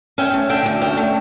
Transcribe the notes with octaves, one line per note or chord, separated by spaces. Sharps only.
C#4 E5 G5
A3
D3 E5 G5
D2
C#4 E5 G5
A3